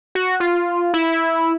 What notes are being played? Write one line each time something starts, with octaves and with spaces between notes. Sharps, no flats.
F#4
F4
E4